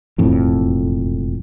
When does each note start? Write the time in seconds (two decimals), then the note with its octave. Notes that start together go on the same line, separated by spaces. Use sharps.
0.18 E1 F2 A2